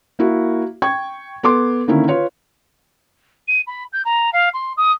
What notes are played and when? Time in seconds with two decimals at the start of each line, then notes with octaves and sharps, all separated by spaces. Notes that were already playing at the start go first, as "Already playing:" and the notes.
0.19 A#3 E4 F#4
0.82 G5 C#6 G#6
1.43 B3 A4 C6 D6
1.88 D3 D#3 A#3 C#4 E4
2.08 F4 B4 C#5
3.48 D#7
3.67 B5
3.93 G6
4.05 A#5
4.33 F5
4.54 C6
4.77 D#6